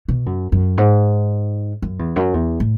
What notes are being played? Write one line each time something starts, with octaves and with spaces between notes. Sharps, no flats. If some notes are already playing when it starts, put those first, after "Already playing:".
B2
F#2
F#2
G#2
F#2
E2
F#2
E2
A2